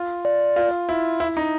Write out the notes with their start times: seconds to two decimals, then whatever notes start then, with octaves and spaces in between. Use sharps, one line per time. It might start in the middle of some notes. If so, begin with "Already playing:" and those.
Already playing: F4
0.25 D5
0.56 F4
0.89 E4
1.20 E4
1.37 D#4